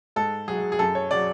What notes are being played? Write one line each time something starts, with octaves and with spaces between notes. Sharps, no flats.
G#2 A4
F#3 G#4
G#4
F#2 A4
C#5
C#3 F#3 D5